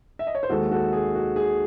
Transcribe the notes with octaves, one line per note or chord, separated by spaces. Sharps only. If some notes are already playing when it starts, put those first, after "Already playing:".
E5
D#5
C#5
C5
D#2 D#3 G#3 F#4 A4
F#4 A4
G#4
F#4
G#4